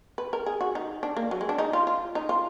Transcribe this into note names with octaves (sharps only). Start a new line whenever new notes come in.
B4
A#4
G#4
F#4
D#4
D4
A#3
F#3
G#3
D4
D#4
F4
F4
D#4
F4